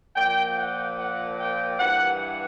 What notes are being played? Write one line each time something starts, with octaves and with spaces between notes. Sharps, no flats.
A#2 F3 G5
F#5
F#5
G5
G2 E3 F#5